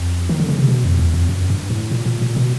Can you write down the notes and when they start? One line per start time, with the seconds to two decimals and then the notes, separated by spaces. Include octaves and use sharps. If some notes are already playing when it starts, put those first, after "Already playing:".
Already playing: F2
0.29 D#3
0.40 D3
0.49 C#3
0.59 C3
0.69 B2
0.84 F2
0.99 E2
1.14 F2
1.29 F#2
1.50 G2
1.70 A2
1.91 A#2
2.06 A#2
2.21 A#2
2.36 B2